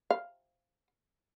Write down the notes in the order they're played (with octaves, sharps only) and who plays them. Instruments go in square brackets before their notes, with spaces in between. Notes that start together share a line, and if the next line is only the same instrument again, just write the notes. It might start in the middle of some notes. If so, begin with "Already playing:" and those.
[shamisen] F5